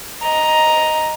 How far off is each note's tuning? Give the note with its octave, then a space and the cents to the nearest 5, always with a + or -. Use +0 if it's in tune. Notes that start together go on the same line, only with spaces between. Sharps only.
D#5 +0 A#5 +5